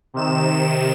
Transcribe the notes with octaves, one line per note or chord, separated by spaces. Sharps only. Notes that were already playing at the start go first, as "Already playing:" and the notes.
C3 D#3 E7